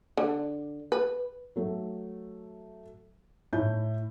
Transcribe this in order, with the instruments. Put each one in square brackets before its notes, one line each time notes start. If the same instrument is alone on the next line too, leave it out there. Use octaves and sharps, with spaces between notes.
[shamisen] D3
B4
[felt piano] F#3 A3
A2 E4 G6